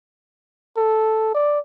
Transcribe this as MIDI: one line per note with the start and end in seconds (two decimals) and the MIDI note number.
0.77 1.32 69
1.34 1.59 74